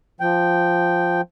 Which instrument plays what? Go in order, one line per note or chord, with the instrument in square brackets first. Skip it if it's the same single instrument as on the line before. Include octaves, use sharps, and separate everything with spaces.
[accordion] F3 G5